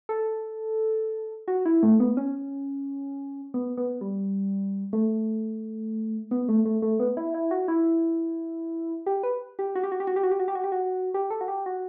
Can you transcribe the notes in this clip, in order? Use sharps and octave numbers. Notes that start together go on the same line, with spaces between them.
A4
F#4
E4
A3
B3
C#4
B3
B3
G3
A3
B3
A3
A3
A3
B3
E4
E4
F#4
E4
G4
B4
G4
F#4
G4
F#4
G4
F#4
G4
F#4
G4
F#4
G4
F#4
G4
F#4
G4
A4
F#4
G4
F#4